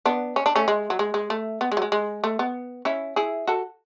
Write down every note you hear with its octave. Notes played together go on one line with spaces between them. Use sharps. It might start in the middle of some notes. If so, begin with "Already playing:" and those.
B3 D4
C#4
D4
A3 C#4
G#3
F#3
G#3
G#3
A3
B3
G#3
F#3
G#3
G#3
A3
B3
C#4 E4
E4 G#4
F#4 A4